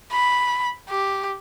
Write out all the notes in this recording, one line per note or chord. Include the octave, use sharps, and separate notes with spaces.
B5
G4